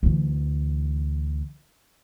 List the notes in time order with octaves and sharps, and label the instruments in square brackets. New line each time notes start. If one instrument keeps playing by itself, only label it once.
[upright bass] D2 E3